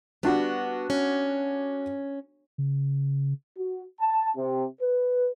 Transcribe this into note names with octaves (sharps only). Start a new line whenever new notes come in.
G3 B3 D4 F#4
C#4
C#3
F#4
A5
C3
B4